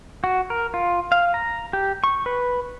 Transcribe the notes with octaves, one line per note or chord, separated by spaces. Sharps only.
F#4
A#4
F4
F5
A#5
G4
C#6
B4